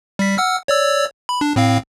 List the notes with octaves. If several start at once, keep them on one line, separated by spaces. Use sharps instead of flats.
G3 B6
F#5 E6 F6
C#5 D5 E6
B5
D4
A2 C4 F5